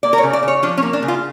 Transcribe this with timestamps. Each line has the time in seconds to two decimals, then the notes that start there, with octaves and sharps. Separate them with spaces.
0.03 A#3 D5
0.13 A#4
0.18 C#5
0.23 C#3
0.33 D5
0.43 C#3
0.48 C#5
0.63 F3 D4
0.77 C#4
0.82 A#3
0.93 D4
1.02 C#3
1.08 F4